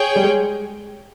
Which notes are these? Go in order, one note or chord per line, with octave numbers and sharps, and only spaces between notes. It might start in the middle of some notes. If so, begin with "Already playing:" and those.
Already playing: G#4 C#5 G5
G3
G#3